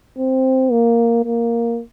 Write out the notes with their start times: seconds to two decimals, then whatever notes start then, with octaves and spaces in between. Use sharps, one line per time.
0.18 C4
0.72 A#3
1.25 A#3